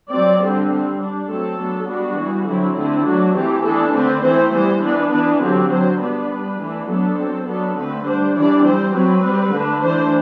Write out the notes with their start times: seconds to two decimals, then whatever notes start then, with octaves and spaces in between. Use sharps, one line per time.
0.10 F#3 C4 D5
0.41 D3 G3 C4
0.70 G3 C4
0.99 G3 D4
1.28 F#3 A3 C4 A4
1.58 F#3 B3 D4
1.87 G3 B3 D4 F#4
2.17 E3 G3 B3
2.46 D3 F#3 C4 E4
2.75 D3 A3 C4 E4
3.05 F#3 A3 D4 F#4
3.34 E3 A3 C4 G4
3.64 E3 B3 D4 A4
3.93 D3 A3 C4 B4
4.22 E3 A3 C4 C5
4.52 E3 G3 B3 C5
4.81 E3 B3 D4 B4
5.10 E3 B3 D4 B4
5.40 D3 F#3 C4 G4
5.69 F#3 C4 C5
5.99 G3 B3 D4 B4
6.28 G3 D4
6.58 E3 A3 D4
6.87 F#3 B3 D4 A4
7.16 F#3 C4
7.46 F#3 B3 D4 A4
7.75 D3 A3 C4 B4
8.04 G3 D4 C5
8.34 E3 G3 D4 D5
8.63 G3 C4 C5
8.93 F#3 C4 B4
9.22 G3 C4
9.51 D3 A3 D4
9.81 E3 A3 D4 C5